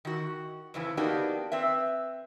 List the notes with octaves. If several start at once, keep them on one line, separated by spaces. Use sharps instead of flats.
D#3 F#4
F2 C#3 E3
A#3 B3 D4 D#4 F#4 G4
C4 B4 E5